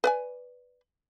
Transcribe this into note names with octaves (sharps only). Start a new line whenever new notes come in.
B4 D5 G#5